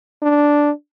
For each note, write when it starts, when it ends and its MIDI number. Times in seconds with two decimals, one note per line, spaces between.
0.22 0.70 62